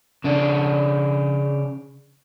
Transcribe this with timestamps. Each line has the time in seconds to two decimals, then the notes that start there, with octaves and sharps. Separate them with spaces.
0.24 C#3 D4